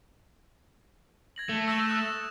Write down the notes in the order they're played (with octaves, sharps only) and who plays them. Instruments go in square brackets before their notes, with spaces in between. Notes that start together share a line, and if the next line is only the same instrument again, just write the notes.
[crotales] G#6 A#6 F#7
[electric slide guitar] A3
[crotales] E6 A#6 E7
D#6 F#6 E7